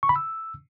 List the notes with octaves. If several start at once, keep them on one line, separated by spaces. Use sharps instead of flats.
C#6
B5
E6